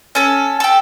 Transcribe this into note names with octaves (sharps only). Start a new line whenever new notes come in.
C#4 A4
G4 A4